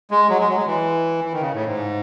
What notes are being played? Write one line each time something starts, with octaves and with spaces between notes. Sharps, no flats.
G#3
F#3
G#3
F#3
G#3
E3
E3
D#3
C#3
A2
G#2